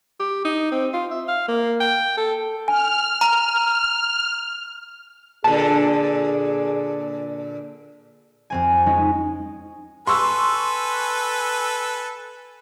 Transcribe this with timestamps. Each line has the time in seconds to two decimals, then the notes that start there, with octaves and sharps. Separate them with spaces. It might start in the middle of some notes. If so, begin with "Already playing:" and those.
0.20 G4
0.45 D#4
0.72 C4
0.93 F4
1.11 E5
1.28 F5
1.48 A#3
1.80 G5
2.17 A4
2.68 G#5 F6
3.21 A#5
5.44 A#2 D3 G#4 A5
8.50 F2 C4 G#5
8.86 G#3 C#4 D#4
10.07 A4 B4 G#5 C6 C#6 E6